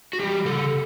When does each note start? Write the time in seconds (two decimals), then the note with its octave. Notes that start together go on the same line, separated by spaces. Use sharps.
0.13 F#4
0.19 E3 G3 G4
0.45 C#3 A4